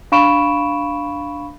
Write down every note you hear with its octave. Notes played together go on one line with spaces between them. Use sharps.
D4 F5 B5 C#6 D7 E7